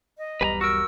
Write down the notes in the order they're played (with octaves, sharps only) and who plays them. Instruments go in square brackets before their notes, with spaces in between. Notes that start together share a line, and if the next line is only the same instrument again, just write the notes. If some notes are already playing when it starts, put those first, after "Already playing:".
[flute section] D#5
[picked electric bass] E1 B1 G3 [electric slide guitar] B4 G#5 A#5
[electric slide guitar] F#4 A#4 [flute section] E6